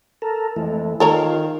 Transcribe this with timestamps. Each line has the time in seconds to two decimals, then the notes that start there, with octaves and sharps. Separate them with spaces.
0.22 A4 A#4
0.56 F2 E3 G#3 A3
1.00 D#3 F4 A4 A#4 C#5